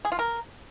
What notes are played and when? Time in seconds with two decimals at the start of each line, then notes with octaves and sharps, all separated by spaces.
0.05 G#4
0.12 F4
0.19 A#4